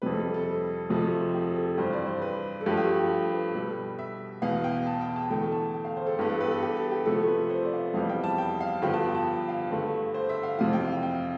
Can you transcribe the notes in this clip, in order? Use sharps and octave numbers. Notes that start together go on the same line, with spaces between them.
F2 C3 G3 B4
A4
A4
F2 C3 F3 A3
G4
A4
G2 E3 G3 C5
D5
C5
B4
A4
G2 F3 A3 G4
G4
G4
B4
B2 G3 B3 A4
E5
E2 B2 B3 F5
G5
A5
G5
A5
E2 D3 A3 G5
A5
G5
F5
C5
A4
G2 E3 B3 G4
A4
B4
A4
G4
A4
G4
C3 F3 A3 A4
B4
C5
D5
F5
E5
F2 E3 G3 B3 F5
G5
A5
G5
F5
G2 D3 F3 B3 G5
A5
G5
A5
F5
G2 D3 A3 B4
C5
E5
F5
F2 C3 E3 F5
G5
F5
G5